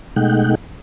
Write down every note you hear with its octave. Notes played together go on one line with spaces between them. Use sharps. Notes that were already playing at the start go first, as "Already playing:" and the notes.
B2 G#3 A3 D#4 F#5 G5